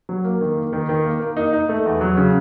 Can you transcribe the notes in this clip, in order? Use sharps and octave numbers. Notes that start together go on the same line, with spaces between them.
F#3
A#3
D#3
A#3
D#3
D#3
A#3
A#3
D#4
D#4
A3
E2
F#3
C#3